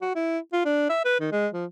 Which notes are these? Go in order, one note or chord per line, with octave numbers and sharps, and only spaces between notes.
F#4
E4
F4
D4
E5
B4
D#3
G#3
F3